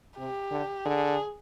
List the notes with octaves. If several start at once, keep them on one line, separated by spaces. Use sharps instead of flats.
C3 G4
D3
D3 G#4